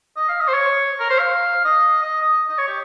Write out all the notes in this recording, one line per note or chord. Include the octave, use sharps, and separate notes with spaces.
D#5
F5
D#5
C5
C#5
A#4
C5
F5
D#5
D#5
D#5
D#5
C#5
G4